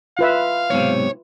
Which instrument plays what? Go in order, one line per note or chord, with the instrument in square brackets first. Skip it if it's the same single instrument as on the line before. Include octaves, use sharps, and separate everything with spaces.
[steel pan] F4 B4 E5 [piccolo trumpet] F5
[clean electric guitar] B1 G#2 C3 [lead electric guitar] C#5